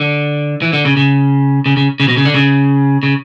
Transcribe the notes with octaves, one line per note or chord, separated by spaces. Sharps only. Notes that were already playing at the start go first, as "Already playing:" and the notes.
Already playing: D3
E3
D3
C#3
C#3
C#3
C#3
C#3
B2
C#3
D3
C#3
C#3